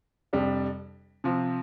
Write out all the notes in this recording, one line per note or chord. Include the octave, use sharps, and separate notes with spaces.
F2 C3 G3 D4
C3 F3 C4